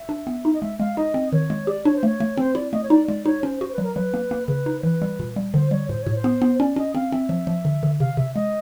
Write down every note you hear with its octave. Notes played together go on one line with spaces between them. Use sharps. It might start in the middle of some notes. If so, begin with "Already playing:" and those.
Already playing: E5
D4
B3
D#4
D#5
G#3 E5
G#3 F5
D#4 D#5
C4
D#3 C#5
G#3
G4 D5
D4 C#5
C5
A3 C#5
A3
C4 C5
E4 D5
A3 D#5
C#5
D#4 D5
G#3 D5
D#4 C#5
C#4 C5
F#4 C5
B4
F#3
A#4
F#3 B4
A#3
A#3
C#3 B4
D#4
C5
E3 B4
G3
A#2
G3
D3 C5
G3 C#5
A2 C5
C#5
A2
C5
B3
B3
C#4 D5
C#4 D#5
C4 F5
C4 E5
F3
F3
D3
D3
C3 F5
C3 E5
G#3 D#5